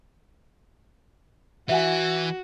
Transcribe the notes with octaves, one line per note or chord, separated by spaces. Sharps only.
E3 F#4 E5 F#5 G#5